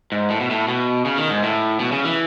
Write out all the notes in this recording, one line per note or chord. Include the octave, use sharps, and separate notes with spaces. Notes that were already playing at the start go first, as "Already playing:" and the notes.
G#2
A2
B2
A2
B2
C#3
D#3
G#2
A2
B2
C#3
E3